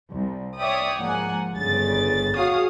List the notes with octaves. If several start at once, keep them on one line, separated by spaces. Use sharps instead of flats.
C2
C#5 D5 E5 G5 D#6
G#2 F3 A#3 F#5 G#5
G1 G2 C#3 A6
F#4 G#4 C#5 F5 D#6